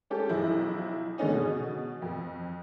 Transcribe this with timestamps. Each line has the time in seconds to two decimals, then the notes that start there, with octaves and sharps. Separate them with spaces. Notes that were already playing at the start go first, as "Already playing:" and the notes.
0.10 G#3 C#4 G4 A4
0.29 B1 F3 E4
1.18 D3 G#3 A3 B3 C#4 D#4
1.33 B2
2.02 F2